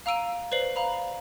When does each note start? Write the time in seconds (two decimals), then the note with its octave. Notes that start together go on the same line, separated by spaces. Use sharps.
0.06 F5 A#5 E6 D7 D#7
0.52 B4 C5 D5 C7 F#7
0.76 F5 A#5 B5